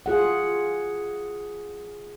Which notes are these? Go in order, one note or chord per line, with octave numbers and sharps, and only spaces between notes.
F4 G#4 F#5